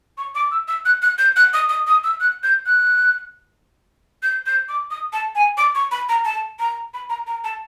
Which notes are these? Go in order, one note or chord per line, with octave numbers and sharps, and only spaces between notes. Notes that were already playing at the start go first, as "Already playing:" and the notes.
C#6
D6
E6
E6
F#6
F#6
G6
F#6
D#6
D#6
D#6
E6
F#6
G6
F#6
G6
G6
D6
D#6
A5
G#5
D6
C#6
B5
A#5
A5
A#5
B5
A#5
A#5
A5